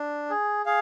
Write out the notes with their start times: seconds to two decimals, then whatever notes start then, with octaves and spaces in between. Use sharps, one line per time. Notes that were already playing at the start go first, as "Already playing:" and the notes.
Already playing: D4
0.30 G#4
0.66 G#4 F5